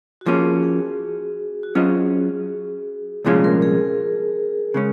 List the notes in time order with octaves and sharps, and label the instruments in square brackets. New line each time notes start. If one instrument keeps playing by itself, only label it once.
[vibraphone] F#4
[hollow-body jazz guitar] F3 A#3 C#4 [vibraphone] G#4
[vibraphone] G#4
F#4
[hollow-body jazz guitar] F#3 C#4 F4 C5 D#5 [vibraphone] G#4
[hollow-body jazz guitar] C2 A#2 F3 G#3 C#4 [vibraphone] G#4
[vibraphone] A#4
G#4
[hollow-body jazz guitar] C#3 G#3 C#4